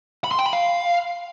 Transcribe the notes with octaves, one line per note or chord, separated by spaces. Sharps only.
B5
C6
G5
B5
F5